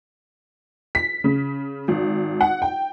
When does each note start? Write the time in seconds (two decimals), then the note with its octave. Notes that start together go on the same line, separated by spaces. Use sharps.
0.95 B6
1.24 C#3
1.88 G#1
2.41 F#5
2.62 G5